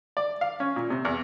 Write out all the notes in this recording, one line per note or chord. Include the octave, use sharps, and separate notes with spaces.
D5
F5
C#4
A#2
C3
E2